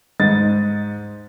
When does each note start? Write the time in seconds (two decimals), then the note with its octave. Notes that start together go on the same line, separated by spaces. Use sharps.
0.20 G#2 D#5 A6